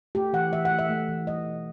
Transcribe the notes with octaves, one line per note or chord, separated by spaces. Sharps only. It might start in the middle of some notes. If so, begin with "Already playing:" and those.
A3 G4
E3 F#5
E3 E5
F#5
A3
E5
A3
E3
G3 D#5
B2